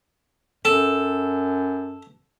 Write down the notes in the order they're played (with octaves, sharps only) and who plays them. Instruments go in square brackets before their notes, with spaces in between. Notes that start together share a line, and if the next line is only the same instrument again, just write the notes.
[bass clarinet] F#2 [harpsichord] A4